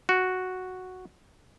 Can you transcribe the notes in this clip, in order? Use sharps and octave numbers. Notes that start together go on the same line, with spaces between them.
F#4